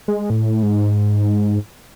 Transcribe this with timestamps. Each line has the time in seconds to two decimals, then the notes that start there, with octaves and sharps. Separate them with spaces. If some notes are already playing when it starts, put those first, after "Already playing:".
0.08 G#3
0.30 A2
0.63 G#2